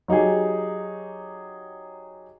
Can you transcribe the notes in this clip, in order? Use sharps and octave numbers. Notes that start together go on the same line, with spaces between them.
F#3 D#4 G4 G#4